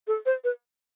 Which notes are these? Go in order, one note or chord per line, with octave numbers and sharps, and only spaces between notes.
A4
C5
B4